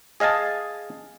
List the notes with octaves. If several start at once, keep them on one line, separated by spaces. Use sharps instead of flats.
G#4 D#5 F5 G#5 A5